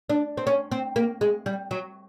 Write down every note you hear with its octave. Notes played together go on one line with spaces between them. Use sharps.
D4
C4
C#4
C4
A#3
G#3
G3
F#3